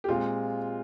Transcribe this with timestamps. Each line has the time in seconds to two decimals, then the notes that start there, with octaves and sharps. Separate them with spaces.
0.04 G4
0.08 A#2 G#3 C4 F4